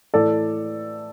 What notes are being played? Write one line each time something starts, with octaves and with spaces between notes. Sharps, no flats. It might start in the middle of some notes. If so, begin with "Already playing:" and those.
A2 E3 A4 D5